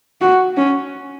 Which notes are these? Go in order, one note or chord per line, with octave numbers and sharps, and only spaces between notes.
F#4
C#4